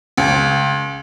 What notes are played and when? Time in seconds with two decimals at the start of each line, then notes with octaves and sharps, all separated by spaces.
0.18 C#2